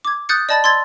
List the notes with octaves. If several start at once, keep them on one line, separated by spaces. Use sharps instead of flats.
D6 G#6
D#6 F#6 G6 A6 C#7
D5 D#5 A5 B5 A6
C6 E6 G#6 A6